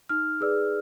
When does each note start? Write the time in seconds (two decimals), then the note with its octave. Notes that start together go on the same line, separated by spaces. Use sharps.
0.09 D#4 F6
0.41 G#4 B4 D5 E6